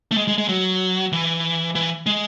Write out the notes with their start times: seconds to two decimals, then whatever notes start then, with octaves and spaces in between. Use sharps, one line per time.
0.11 A3
0.17 G#3
0.28 G#3
0.38 G#3
0.49 F#3
1.12 E3
1.75 E3
2.06 G#3